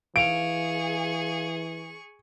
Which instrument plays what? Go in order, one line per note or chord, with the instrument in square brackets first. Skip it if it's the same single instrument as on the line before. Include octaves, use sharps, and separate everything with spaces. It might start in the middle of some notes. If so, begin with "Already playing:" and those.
[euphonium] E3 [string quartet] G#4 C#6 [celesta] F5 F7 [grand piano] D7